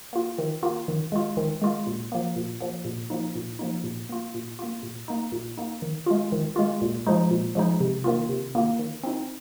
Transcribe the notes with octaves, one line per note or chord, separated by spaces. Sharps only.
A#3 F4
D#3
A#3 F4
D#3
G#3 F4
D#3
G#3 F4
A#2
F3 A#3
A#2
F3 A#3
A#2
F3 A#3 D#4
A#2
F3 A#3 D#4
A#2
A#3 F4
A#2
A#3 F4
A#2
A#3 D#4
A#2
A#3 D#4
D#3
G#3 F4
D#3
G#3 F4
A#2
F3 G#3 D#4
A#2
F3 G#3 D#4
C3
D#3 A#3 F4
C3
D#3 A#3 F4
D#3
C4 D#4